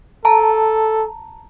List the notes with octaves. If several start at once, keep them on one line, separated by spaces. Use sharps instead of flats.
A4 A5 A#5